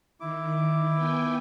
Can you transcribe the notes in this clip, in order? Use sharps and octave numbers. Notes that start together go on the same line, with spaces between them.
D#3 E4 D6
B3 G5 G#5